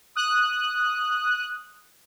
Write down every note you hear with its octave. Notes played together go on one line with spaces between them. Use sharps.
D#6 F#6